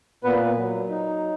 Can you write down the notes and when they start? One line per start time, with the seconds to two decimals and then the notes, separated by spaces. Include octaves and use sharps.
0.24 A#2 B3 B4
0.57 F#3
0.89 D#4